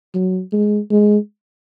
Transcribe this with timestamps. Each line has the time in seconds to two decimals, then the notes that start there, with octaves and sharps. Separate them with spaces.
0.15 F#3
0.53 G#3
0.91 G#3